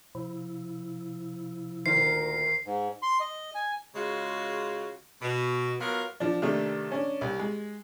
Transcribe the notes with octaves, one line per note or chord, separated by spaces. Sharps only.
C3 F3 E4
D2 A#2 D#3 A#4 C5 C7
G#2
C6
D#5
G#5
C#3 G#3 F4 F#4
B2
F#3 B3 F4 A#4
F3 D4
C3 D#3 A3 D4 D#4
C#4 D4
C2
G#3